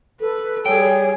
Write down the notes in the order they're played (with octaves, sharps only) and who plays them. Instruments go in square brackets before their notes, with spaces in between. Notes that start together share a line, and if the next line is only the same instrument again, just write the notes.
[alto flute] A4 [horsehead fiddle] B4
[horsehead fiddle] G3 G#4 [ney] C#5 [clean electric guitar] G5